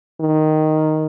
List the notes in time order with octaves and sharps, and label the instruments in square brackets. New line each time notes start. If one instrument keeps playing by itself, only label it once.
[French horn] D#3